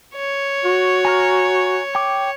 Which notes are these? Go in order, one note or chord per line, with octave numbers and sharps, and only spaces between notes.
C#5
F#4
G#5 A#5 F6
G5 D6